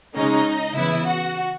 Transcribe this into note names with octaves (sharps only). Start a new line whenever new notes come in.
C#3 G#3 C#4 D#4 D#5
C#3 E3 B3 E4 E5
F#4 F#5